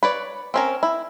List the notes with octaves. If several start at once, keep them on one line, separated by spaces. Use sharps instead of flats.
B4 C#5 D5
C4 C#4 A#4
E4